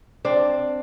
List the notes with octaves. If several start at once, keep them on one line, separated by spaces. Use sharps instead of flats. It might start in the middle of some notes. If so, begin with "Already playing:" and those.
C4 D4